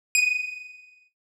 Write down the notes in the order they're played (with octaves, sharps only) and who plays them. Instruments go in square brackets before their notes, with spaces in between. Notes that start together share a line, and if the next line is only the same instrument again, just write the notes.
[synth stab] D#7